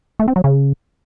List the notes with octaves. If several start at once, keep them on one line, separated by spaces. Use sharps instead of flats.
A3
C4
F#3
C#3